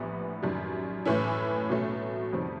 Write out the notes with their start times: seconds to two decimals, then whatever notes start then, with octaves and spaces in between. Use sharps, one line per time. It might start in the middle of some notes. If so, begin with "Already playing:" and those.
Already playing: A#1 A2 E3 G3 B3
0.42 F#2 D#3 G3
1.05 A2 E3 A3 C#4 E4
1.69 C2 B2 F#3 A3 C#4
2.33 F2 C3 D#3 G3 C4